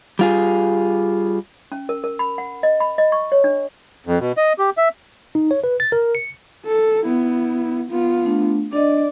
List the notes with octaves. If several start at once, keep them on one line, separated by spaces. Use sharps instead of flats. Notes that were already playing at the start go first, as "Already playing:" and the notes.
G3 F4 G#4
C#4
A#4
A#4
B5
F#5
D#5
B5
D#5
C#6
C#5
D4
F2
B2
D#5
G4
E5
D#4
C#5
B4
A6
A#4
C#7
A4
B3 E4
B3 F4
A3 D4
D4 D5 D#5